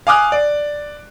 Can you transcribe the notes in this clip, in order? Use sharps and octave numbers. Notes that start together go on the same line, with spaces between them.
F5 G#5 D6 D#6 F6 F#6
D5